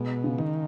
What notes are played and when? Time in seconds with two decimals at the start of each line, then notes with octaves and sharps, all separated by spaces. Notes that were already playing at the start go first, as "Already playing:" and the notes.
Already playing: B2 G#3
0.24 C#3
0.38 D#3